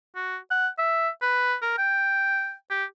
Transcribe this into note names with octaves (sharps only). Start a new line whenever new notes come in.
F#4
F#5
E5
B4
A#4
G5
G4